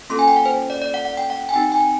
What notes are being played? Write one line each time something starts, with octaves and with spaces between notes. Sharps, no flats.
A#3 C#4 F4 A4 C6
G#5
G5
F#5
C5
D5
D5
F#5
F#5
G5
F#5
G#5
C4 D#4 G4 G5
G#5